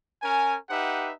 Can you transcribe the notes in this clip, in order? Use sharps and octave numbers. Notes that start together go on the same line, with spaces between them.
C#4 A#4 G#5
D#4 G4 B4 E5 F#5